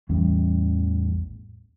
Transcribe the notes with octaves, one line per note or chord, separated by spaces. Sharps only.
A1 E2 G3 C#4